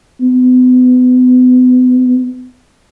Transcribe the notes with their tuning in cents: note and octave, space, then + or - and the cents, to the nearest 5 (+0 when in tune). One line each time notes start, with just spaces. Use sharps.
B3 +35